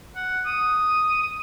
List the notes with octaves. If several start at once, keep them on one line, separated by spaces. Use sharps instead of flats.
F#5
D#6